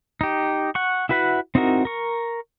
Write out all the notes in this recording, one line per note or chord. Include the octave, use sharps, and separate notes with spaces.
D#4 G4
F#5 C#6
E4 F#4 B4 E5 F#5
C4 D#4 E4 F#4 A#4
A#4 C#6